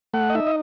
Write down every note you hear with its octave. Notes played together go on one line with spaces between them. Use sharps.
A3 F#5
D#5
D#4 E5
D#5